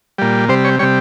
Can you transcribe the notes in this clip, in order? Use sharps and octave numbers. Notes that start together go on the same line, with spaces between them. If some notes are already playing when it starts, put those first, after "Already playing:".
A#2 G3
C3 G3 C5
C#5
C3 G3 C#5